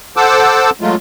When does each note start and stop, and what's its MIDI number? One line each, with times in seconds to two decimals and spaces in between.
0.17 0.70 69
0.17 0.70 72
0.17 0.70 78
0.17 0.70 81
0.17 0.70 86
0.17 0.70 88
0.81 0.95 54
0.81 0.95 56
0.81 0.95 57
0.81 0.95 65